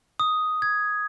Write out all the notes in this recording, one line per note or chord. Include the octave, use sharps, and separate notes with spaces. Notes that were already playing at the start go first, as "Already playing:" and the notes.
D#6
G#6